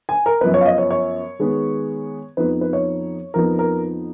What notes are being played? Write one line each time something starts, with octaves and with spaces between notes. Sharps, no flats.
G#5
A#4
F#2 F3 B3 B4
C#5
F5
D#5
C#5
C#5
D#3 G#3 B3
F2 F3 B3 D#4 B4
B4
C#5
F2 F3 B3 D#4 A#4
A#4